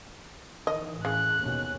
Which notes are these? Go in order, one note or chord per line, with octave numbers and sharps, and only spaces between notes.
D#3 E3 D#5
A2 C#3 F#6
D#2 B2 C#4